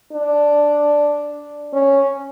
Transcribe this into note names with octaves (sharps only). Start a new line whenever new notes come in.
D4
C#4